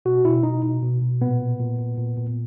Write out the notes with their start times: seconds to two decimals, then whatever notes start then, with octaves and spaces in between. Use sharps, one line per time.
0.05 B2 F#4
0.25 B2 E4
0.43 B2 D#4
0.63 B2
0.82 B2
1.02 B2
1.21 A#2 B3
1.40 A#2
1.59 A#2
1.79 A#2
1.98 A#2
2.17 A#2